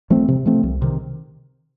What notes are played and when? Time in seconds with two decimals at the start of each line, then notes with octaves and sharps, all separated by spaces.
0.10 F3 A3 C4
0.28 C3
0.46 F3 A3 C4
0.63 C2
0.82 C3 D#3